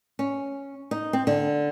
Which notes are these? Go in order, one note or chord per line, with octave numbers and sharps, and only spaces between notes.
C#4
D#4
C4
D3